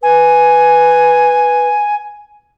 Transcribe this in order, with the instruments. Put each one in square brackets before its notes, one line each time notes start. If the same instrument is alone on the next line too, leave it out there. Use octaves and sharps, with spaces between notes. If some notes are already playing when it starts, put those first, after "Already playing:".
[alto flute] B4 [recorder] G#5